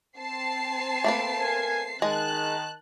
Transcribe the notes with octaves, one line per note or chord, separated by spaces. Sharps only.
C4 A5 C7
A3 A#3 B4
A#4 G#5
D#3 G#3 A5 F#6